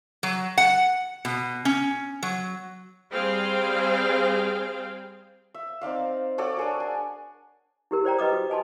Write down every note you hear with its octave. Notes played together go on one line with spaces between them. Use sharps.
F#3
F#5
B2
C#4
F#3
G3 C4 G#4 C5 F5 G5
E5
C4 D#4 D5 F5
F#4 A4 C#5 D5
D4 G#4 A#4
G#5
E4 G4 A#4
C5 D5 G5 A#5
G4 B4 D#5 D6 D#6
F#4
D#5 G#5 A5 C6